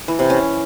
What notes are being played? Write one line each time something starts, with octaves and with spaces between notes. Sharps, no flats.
E3
C3
C#4